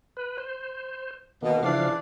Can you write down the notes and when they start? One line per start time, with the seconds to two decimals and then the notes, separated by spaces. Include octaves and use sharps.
0.17 B4
0.38 C5
1.42 B2 D#3 A#3
1.63 C#3 E3 F3 D4 F5